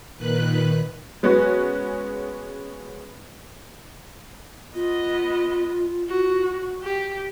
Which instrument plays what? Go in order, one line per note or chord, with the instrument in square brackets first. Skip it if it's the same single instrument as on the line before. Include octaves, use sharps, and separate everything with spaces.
[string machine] A#2 D#3 B4 F#6
[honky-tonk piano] G#3 B3 C#4 F#4
[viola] B3 D#5 [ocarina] F4
[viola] F#4
G4